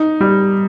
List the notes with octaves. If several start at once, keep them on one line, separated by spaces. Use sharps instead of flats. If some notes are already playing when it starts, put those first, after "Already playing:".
Already playing: D#4
G3